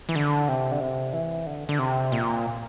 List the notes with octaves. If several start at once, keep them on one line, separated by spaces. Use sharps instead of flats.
E3
D3
C3
D3
C3
E3
D3
D3
C3
A#2